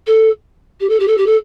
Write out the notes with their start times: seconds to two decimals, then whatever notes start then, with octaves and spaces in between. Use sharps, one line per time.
0.07 A4
0.80 G4
0.89 A4
1.00 G4
1.07 A4
1.17 G4
1.26 A4